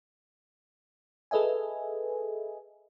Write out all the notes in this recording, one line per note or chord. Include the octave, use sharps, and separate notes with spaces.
G#4 A4 B4 D#5 E5 G#5